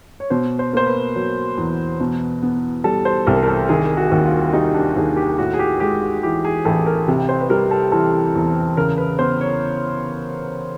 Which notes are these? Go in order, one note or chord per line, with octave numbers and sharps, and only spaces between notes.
C#5
B2 C5
C5
A#3 C5
B4
F#3
E2
B2
B3
G3 A4
C5
C2 A#4
A#4
A4
D#3 G#4
F#4
D#2
F4
G3 D#4
D4
D#2 G#4
G4
A2 F#4
G#4
G4
G#3 G4
F#4
E3 G4
G#4
A1 A4
A#4
C3
C5
B4
G3 A#4
A4
E3 A4
E2
C#3 A#4
B4
B3 C5
C#5